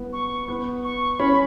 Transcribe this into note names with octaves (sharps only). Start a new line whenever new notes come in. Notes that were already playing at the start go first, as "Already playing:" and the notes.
Already playing: B3
C#6
B3
C#6
C#4 B5